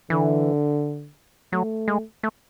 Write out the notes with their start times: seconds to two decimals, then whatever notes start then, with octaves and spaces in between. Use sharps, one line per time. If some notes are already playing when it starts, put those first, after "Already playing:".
0.10 D3 E3
1.53 F#3 A3
1.88 G#3
2.23 A3